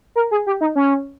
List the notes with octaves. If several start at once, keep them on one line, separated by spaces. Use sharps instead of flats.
A#4
G#4
G4
D#4
C#4